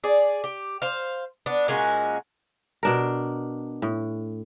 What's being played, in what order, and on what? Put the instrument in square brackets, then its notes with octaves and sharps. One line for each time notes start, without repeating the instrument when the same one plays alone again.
[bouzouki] G#4 D5
G4
C5 F5
B3 D4
A#2 G#3 C#4 F#4
[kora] B2 D4 A#4
A2